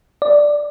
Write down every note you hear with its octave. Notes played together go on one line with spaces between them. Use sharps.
D5